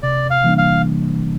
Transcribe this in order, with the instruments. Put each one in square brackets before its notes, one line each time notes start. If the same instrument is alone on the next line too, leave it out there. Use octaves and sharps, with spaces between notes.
[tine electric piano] C3 [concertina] D5
[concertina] F5
[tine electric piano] E3 G3 A#3 D4
[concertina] F5